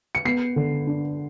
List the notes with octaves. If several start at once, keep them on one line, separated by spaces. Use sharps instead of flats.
C#7
B3 C7
D3
D4